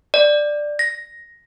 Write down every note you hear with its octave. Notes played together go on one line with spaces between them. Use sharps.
D5
A#6